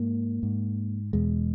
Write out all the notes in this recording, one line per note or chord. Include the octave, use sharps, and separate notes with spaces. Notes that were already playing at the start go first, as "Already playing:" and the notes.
Already playing: G#2 A#3
G#2
E2 B2 G#3